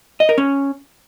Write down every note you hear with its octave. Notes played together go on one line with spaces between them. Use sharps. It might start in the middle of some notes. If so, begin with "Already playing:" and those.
D#5
A#4
C#4